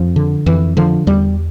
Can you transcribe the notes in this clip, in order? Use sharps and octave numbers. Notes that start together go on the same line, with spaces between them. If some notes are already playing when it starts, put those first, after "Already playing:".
Already playing: F2 F3
D3
F2 E3
D3 F3
E2 G3